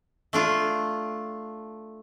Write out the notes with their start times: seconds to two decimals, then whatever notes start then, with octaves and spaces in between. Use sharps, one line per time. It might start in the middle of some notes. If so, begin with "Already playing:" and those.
0.33 A3 D4 F4